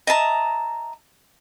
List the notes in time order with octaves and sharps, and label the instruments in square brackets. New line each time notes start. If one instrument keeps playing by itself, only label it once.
[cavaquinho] D#5 E5 A5 A#5